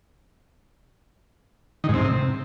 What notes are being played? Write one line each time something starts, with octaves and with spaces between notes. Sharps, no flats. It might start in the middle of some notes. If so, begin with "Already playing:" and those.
D#3
G#2
C3